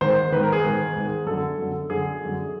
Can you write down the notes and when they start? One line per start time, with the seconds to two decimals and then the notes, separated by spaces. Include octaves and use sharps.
0.01 G#2 D#3 C5
0.32 G#2 D#3 B4
0.43 A#4
0.53 G#4
0.64 G#2 D#3
0.96 G#2 D#3
1.26 F#2 D3 A4
1.59 F#2 D3
1.90 F#2 D3 G#4
2.21 F#2 D3